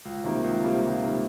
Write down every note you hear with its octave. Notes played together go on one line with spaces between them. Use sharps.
C#2
C3 D#3 G3 A#3
C#2
C3 D#3 G3 A#3
C#2
C3 D#3 G3 A#3